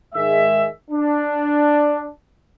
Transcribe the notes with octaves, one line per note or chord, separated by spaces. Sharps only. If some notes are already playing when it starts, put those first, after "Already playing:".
G#2 D#3 G#3 G#4 E5
D4